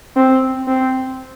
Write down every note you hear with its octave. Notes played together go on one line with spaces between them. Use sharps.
C4
C4